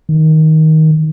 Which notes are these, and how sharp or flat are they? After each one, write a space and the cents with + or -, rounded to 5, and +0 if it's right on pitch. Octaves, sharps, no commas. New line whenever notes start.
D#3 +15